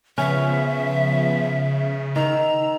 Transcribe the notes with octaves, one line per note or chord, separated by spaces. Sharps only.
C#3 F3 B3 C#4 E5
D#3 A#5 E6